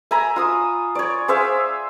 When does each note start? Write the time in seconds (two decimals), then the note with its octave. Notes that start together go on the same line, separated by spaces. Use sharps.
0.11 E5 G#5 A#5 B5
0.36 F4 D#6 E6
0.95 C#5 D5
1.28 G#4 C5 E5 F5